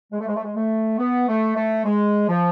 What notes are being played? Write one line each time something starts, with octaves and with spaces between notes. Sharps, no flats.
G#3
A3
G#3
A3
G#3
A3
B3
A3
A3
G#3
F3